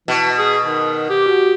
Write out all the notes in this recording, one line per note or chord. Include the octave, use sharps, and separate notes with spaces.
B2 E3 A5
G#4 D#6
D#3
G4 D6
F#4